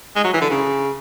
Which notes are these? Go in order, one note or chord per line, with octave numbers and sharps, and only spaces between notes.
G#3
F#3
E3
D3
C#3